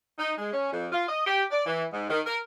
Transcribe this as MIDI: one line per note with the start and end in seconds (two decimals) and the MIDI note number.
0.19 0.33 63
0.38 0.52 56
0.53 0.70 61
0.72 0.88 41
0.92 1.05 65
1.08 1.23 75
1.27 1.43 67
1.51 1.63 74
1.66 1.84 52
1.92 2.06 44
2.10 2.20 51
2.26 2.37 70